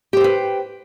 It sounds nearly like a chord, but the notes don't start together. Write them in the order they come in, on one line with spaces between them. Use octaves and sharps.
G4 C5 G5 B4